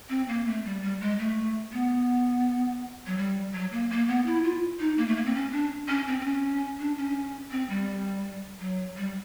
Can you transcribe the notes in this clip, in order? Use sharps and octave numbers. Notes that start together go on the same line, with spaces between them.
C4
A#3
A3
G3
G3
G#3
A3
B3
F#3
G3
F#3
A#3
A#3
B3
E4
F4
D#4
A#3
A3
A#3
C4
C#4
D4
C#4
C4
C4
C#4
D4
C#4
C4
G3
F#3
G3